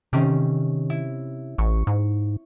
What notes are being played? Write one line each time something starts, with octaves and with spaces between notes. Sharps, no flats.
C3 D#3 C4 C#4
E4
A1 C#6
G#2